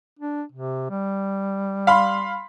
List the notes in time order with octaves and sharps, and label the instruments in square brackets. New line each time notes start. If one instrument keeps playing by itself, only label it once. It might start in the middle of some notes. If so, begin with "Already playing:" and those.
[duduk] D4
C3
G3
[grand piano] F5 B5 C6